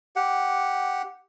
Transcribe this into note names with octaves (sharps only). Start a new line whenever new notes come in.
G4 F#5